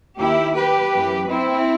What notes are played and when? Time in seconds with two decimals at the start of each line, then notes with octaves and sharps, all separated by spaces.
0.19 D#2 D#3 E4 G4
0.56 G4 B4
0.94 F#2 E3
1.30 C4 E4